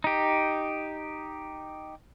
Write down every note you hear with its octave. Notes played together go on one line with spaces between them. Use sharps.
D#4 G4